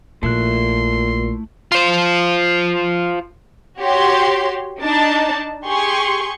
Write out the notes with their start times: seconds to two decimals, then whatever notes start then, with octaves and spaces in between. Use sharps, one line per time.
0.23 A#1 A#2 A3 E4 C6 F#6
1.72 F4 C5
3.79 F#4 G4 C#5 C6
4.81 D4 D#4 A5
5.65 G4 G#4 C6 C#6